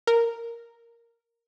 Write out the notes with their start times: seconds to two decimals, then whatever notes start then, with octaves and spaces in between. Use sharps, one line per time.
0.07 A#4